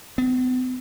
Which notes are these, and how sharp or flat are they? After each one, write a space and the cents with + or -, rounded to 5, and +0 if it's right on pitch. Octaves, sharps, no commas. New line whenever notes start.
B3 +45